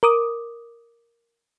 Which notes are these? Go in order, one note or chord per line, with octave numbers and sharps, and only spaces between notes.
A#4 D6 D#6